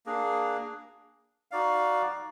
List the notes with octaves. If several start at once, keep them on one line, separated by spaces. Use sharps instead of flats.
A#3 D4 G#4
D#4 F#4 D5 F5